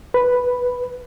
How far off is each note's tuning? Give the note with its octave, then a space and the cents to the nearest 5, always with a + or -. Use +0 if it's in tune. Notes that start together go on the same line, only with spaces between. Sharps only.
B4 +0 B5 +0